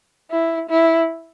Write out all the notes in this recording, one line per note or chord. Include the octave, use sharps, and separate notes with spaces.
E4
E4